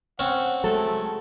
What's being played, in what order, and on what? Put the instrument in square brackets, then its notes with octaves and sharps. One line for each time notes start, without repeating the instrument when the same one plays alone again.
[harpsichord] C4 C#4 [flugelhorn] F#5
[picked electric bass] F#3 G#3 [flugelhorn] A3 [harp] A4